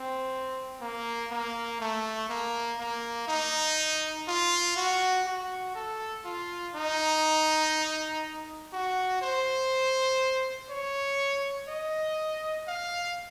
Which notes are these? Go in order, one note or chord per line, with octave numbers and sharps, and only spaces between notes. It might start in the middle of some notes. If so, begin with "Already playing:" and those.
Already playing: C4
A#3
A#3
A3
A#3
A#3
D#4
F4
F#4
F#4
A4
F4
D#4
F#4
C5
C#5
D#5
F5